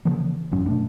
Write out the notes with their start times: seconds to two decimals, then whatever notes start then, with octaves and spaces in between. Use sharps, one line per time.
0.05 C#3 E3 F3 A#3
0.51 A1 F#2 F#3 C#4
0.66 B2 A3 D4